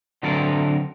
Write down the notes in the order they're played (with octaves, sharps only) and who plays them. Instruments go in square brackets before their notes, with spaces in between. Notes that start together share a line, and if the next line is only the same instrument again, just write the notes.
[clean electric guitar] D3 F#3 C4 A4 A#4